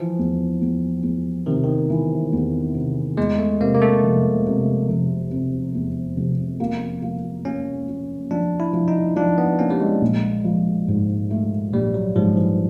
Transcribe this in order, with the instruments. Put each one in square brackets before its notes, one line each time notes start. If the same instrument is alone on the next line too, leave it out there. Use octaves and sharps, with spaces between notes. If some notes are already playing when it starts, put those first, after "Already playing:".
Already playing: [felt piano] E3 [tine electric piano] F3
[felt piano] E2
E2
E2
[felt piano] C3 [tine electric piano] D#3
[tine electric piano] D#3
[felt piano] E3
E2
C3
[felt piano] E2 [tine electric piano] G#3
[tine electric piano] A3
[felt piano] C3 [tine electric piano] A#3
[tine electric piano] A#3
A3
[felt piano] F1
C3
F1
C3
E2
F1
A#3
A#3
[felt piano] A#3 [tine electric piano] C#4
[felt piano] A#3
[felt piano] F3 [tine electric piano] D4
[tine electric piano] E4
[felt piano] F3
[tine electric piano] D#4
[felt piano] F3 [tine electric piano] D4
[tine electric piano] B3
[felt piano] A#3 [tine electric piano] C#4
[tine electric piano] G3
G#3
[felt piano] A#1
F3
G#2
A3
[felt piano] A#1 [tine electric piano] G3
[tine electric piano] F#3
[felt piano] G#2 [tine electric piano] F3
[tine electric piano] E3